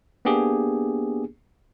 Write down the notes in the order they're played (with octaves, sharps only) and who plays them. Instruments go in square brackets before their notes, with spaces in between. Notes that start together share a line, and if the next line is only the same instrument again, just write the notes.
[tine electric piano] A#3 B3 D4 G4 G#4